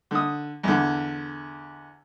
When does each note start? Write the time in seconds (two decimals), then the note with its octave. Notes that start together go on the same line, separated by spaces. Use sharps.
0.11 D3 D#6
0.63 E2 D3